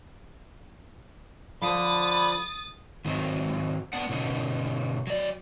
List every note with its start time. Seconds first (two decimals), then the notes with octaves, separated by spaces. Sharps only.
1.62 D3 F3 C5 B5 D#6 A6
3.05 G#2 D#3 F#3 C4
3.93 B3 D4 F#5
4.09 B2 D3 C#4 D#4
5.07 F#3 D5